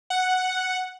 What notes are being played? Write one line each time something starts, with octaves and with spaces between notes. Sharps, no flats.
F#5